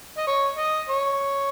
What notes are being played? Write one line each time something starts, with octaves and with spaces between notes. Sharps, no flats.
D#5
C#5
D#5
C#5